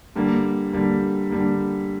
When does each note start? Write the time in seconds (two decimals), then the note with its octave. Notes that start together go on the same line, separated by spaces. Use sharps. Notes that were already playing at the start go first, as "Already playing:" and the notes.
0.16 D3 G3 A#3
0.73 D3 G3 A#3
1.30 D3 G3 A#3